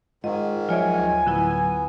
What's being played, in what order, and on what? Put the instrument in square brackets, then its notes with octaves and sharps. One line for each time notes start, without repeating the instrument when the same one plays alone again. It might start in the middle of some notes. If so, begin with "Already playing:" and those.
[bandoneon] G#2 D#3 [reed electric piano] G#3 F4 F#5 [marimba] D#5
[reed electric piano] F3 F#3 E5 [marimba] F4 C#5 D5 [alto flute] G#5
[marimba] D2
[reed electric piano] A2 F#3 [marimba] D3 E4 [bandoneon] B3